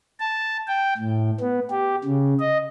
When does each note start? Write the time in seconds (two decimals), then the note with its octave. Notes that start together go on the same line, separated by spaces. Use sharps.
0.20 A5
0.67 G5
0.97 A2
1.41 B3
1.71 G4
2.04 C#3
2.39 D#5